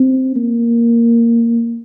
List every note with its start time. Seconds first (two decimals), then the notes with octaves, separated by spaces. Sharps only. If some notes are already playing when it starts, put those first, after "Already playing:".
Already playing: C4
0.36 A#3